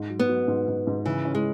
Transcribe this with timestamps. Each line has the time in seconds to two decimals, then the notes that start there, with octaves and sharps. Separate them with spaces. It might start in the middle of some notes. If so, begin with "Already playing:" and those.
Already playing: G#2
0.10 F#3
0.19 B3
0.28 F#3
0.48 G#2
0.68 G#2
0.87 G#2
1.06 C#3 E3
1.25 C#4
1.35 G#3